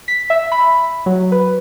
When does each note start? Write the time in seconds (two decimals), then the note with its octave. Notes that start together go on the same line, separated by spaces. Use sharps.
0.08 B6
0.30 E5
0.52 B5
1.06 F#3
1.32 B4